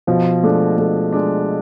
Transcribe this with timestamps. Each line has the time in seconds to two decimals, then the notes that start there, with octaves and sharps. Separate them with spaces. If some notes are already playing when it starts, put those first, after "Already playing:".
0.07 B2 F3
0.43 G#3 A3 D4
0.78 B2 A3
1.13 G#3 D4